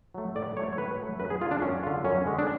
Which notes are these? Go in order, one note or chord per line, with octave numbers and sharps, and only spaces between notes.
F#3 A3
A2 D5
F#3 A3 C#5
C#5
A2 B4
F#3 A3
F#2 B4
G#4
D3 G#3 F4
D4
F#2 C#4
D3 G#3 F4
F#2 C#4
D3 G#3
D4